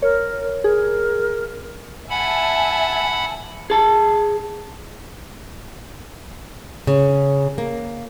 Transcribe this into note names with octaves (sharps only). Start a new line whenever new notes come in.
A#4 C#5
G#4 A#4
E5 F#5 G#5 A5 B5
G#4 A5
C#3
A#3